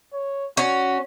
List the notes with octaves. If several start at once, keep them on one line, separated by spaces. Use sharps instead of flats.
C#5
C#4 F#4